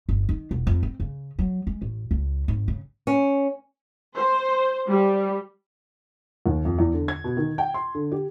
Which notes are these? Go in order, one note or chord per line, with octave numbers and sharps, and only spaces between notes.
G1
D#3
E1
F2
C4
C#3
F#3
G#3
A1
C#2
G#1
C#3
C#4
C5
G3
D#2
F2
E2
D3
G#6
B2
D#3
G5
C6
D3
G4